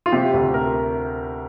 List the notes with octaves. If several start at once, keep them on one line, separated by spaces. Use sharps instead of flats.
F4
C3 G4
D2
A#4